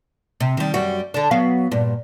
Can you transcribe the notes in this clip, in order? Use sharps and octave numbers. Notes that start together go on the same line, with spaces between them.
C3
D#3 G3
F#2 G3 F#4
D3 D4
F#3 B3 F5
G2 A#2